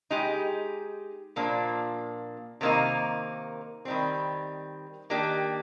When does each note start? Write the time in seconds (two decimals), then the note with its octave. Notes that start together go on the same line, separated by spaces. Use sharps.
0.10 G#3 D#4 G4
1.36 A#2 F3 A#3 D4
2.61 C3 D#3 A#3 D#4
3.85 D#3 G3 C4
5.10 D#3 A#3 D4 G4